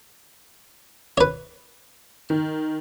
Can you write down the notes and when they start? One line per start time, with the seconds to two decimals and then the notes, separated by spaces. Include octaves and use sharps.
1.18 B4 C#5
2.30 D#3